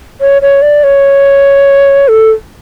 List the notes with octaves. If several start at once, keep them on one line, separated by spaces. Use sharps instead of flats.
C#5
C#5
D5
C#5
A4